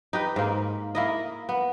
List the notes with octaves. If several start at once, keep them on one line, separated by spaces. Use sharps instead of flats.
D#4 G4 B4
G#2 A#3
A#3 E4 D#5
B3